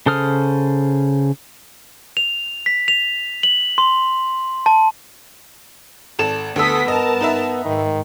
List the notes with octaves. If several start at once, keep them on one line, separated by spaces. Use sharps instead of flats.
C#3 A4 C5 D#6 F6
F7
B6
F7
F#7
C6
A5
G#1 A4 E7
D2 B3 A4 D#6 E6 B6
G2 A#4 D#5 A5
D#4 B4 E5
G#2 D#3